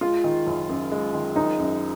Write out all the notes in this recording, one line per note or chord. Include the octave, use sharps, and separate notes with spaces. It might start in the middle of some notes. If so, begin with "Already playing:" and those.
G#3 F4
D#3
F#1
F#2
G#3
D#3
F#1 D#4
F#2